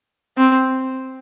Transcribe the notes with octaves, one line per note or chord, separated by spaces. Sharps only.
C4